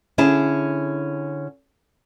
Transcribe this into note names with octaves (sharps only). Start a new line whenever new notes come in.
D3 C#4 E4 G#4 A5